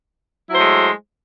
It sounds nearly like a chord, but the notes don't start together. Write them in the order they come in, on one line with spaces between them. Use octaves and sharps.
E4 F#3 C5 A3 G#3